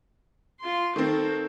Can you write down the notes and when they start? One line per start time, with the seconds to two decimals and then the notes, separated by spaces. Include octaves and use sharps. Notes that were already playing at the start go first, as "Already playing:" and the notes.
0.60 F4 C6
0.96 D#3 C4 A4 A#4